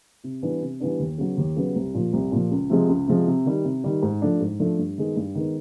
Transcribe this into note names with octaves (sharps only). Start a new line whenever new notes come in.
C3
E3 G3 B3 D4
C3
E3 G3 B3 D4
D#2
C#3 F#3 B3
D#2
C#3 F#3 B3
C2
A#2 F3
C2
A#2 F3
C#2
C3 F3 G#3
C#2
C3 F3 G#3
C3
D#3 G3
C3
D#3 G3
G#2
F3 A3 D4
G#2
F3 A3 D4
G2
D#3 G#3 B3
G2
D#3 G#3 B3